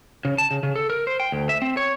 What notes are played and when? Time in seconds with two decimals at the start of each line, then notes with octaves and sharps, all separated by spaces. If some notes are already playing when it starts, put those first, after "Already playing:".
0.25 C#3
0.38 A5
0.51 C#3
0.63 C#3
0.76 A4
0.90 A#4
1.07 C5
1.20 G5
1.32 D2
1.49 E5
1.62 C4
1.77 C#5